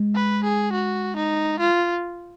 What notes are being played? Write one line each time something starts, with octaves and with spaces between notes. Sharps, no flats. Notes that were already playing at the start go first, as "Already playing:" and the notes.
Already playing: G#3
B4
G#4
F#4
D#4
F4